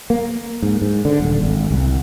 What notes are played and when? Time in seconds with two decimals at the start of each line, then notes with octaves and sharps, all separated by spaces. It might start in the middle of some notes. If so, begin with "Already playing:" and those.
0.10 A#3
0.62 G#2
0.82 G#2
1.05 D3
1.20 D#1
1.43 G#1
1.71 C2